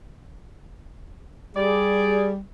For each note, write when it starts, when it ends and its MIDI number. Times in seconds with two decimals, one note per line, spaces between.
1.55 2.39 55
1.55 2.29 68
1.55 2.29 74